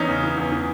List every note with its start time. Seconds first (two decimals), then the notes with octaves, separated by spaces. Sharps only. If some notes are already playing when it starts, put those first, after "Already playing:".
Already playing: E2 C#4 D#4
0.09 C#3
0.23 E3
0.38 E2
0.52 E3